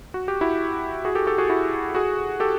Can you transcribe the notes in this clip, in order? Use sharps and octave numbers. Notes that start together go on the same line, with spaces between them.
F#4
G4
E4 F#4
F#4 G#4
G4 A4
G4 A4
F#4 G#4
E4 F#4
F#4 G#4
G4 A4